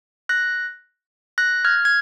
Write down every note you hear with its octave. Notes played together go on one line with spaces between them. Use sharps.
F#6 A#6
F#6 A#6
F6 G#6
G#6